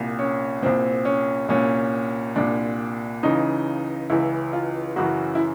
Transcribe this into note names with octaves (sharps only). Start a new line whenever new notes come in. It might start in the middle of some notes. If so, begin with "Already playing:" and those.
Already playing: C2 A#2
C#4
C2 A#2 C4
C#4
C2 A#2 C#4
C2 A#2 D4
C#2 C#3 E3 D#4
C#2 C#3 E3 E4
F4
F#2 C#3 E3 F#4
E4